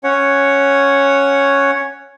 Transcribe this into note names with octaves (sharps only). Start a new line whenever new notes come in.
C#4 C#5 F#5